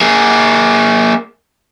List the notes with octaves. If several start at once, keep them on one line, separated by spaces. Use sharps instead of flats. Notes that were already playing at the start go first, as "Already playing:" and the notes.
A#3 G#4